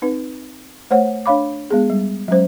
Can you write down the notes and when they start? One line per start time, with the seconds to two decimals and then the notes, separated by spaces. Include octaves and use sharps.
0.02 C4 D#4 B4
0.91 A3 C5 C#5 F#5
1.26 D4 C#5 F5 B5 D6
1.71 G#3 B3 G#4
1.90 G3
2.28 F#3 G#3 C#4 C5